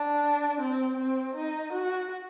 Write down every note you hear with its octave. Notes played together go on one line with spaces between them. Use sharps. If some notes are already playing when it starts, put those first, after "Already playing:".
Already playing: D4
C4
C4
D#4
F#4